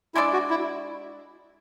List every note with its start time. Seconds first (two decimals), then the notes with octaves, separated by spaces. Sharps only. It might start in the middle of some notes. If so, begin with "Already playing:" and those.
0.15 G#3 D4 E4 A4 D5
0.33 F#4
0.50 E4